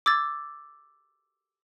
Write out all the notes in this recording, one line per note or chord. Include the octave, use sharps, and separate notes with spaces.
D6 E6 G#6 A6